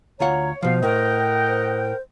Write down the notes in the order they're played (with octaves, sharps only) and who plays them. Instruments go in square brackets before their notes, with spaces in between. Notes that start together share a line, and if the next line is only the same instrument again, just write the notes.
[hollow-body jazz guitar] D2 F4 F#5 [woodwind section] C#5 [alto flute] A#5
[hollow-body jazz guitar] B2 F3 [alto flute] C5 [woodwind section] F5
[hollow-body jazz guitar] A2 [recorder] A#4 [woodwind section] D#5 F#5 G5
[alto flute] C5